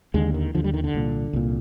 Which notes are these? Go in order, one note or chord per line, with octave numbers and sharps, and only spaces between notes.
D#2 D3 G#3
D#3
D#2 D3 F3
G3
D#3
D3
C2 A#2
C2 A#2